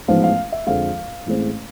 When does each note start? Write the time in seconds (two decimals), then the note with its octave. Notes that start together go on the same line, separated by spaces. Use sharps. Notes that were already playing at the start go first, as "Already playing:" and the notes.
0.08 A1 G#2 F3 G#3 B3 F5
0.23 F5
0.52 E5
0.67 F2 D3 F3 G#3 F5
1.26 A1 A2 G#3 C4